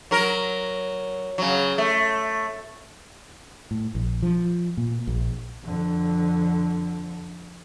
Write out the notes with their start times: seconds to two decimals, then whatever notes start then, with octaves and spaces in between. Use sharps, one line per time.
0.11 F#3 A#4
1.38 C#3 F#3
1.78 A3
3.71 A2
3.95 A#1
4.22 F3
4.77 A#2
5.07 A#1
5.64 F2 D3